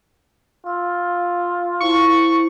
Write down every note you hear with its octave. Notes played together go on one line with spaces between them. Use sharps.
F4 E6
E4 C5 A5 C#6